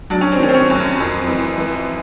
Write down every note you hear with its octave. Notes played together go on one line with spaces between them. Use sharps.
F#3 D4
C#4
C4
D#3 C#4
C4
C#4
F#2
F2
E3
E3